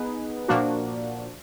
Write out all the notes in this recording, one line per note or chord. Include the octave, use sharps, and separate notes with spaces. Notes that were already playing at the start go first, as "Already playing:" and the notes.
Already playing: B3 D#4 G#4 B4
A#2 F3 A#3 D4 F#4